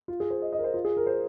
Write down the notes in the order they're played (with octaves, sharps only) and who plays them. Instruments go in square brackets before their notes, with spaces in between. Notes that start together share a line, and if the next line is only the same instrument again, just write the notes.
[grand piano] F4
G#4
C5
D#5
D#5
A#4
C5
F4
G#4
A#4
C5